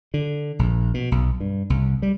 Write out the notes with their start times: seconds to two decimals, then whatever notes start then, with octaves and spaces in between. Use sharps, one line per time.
0.14 D3
0.59 A#1
0.94 B2
1.12 B1
1.40 G2
1.70 C2
2.02 G3